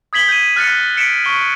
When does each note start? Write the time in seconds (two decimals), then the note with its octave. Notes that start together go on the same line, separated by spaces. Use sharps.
0.13 D#6 G#6 B6 F#7 G7
0.28 G6 D#7
0.56 F6 F#6 A6 B6 C#7
0.97 B6 C#7 D7 E7
1.25 C#6 G7